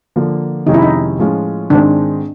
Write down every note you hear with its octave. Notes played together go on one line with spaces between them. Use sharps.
D3 F3 A#3
F2 C3 D#3 G#3 C#4 D#4
E4
D#4
A2 F3 G#3 C#4 F4
G#2 D#3 G#3 C4 D4